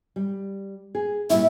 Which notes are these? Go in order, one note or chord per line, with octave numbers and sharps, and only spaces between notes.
G3
G#4
A#2 G3 E4 E5